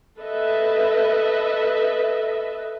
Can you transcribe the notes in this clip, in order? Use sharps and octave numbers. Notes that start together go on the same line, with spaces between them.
A4 B4 D#5 E5